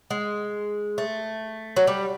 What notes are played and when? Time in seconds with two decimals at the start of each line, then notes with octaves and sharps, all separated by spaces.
0.11 G#3
0.98 A3
1.76 F#3
1.87 G3